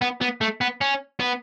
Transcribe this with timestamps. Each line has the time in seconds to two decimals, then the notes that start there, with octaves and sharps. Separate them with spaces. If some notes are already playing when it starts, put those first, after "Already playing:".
0.02 B3
0.21 B3
0.41 A3
0.61 B3
0.81 C#4
1.20 B3